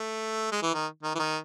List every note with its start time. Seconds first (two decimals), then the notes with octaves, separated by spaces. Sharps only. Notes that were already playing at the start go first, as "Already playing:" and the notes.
Already playing: A3
0.51 G#3
0.62 E3
0.74 D#3
1.03 D#3
1.15 E3
1.19 D#3